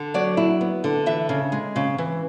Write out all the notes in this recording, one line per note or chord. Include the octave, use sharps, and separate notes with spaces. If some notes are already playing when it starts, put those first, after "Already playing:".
Already playing: D3
F#3 D5
E4
B3
D3
E3 E5
C#3
G#3
C#3
E3